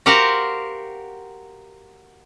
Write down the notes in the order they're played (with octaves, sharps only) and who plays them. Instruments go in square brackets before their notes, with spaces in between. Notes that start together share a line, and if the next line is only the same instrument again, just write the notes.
[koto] F#4 G4 A#4 C5 F5 F#5